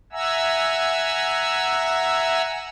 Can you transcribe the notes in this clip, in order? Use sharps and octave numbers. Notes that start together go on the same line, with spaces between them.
E5 F#5 G#5 A#5 E6